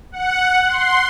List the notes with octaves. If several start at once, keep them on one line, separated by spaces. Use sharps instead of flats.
F#5
C6